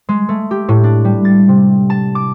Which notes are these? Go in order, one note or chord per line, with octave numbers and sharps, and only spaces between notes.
G#3
A3
G4
A2
D4
G3
A6
C3
A5
D6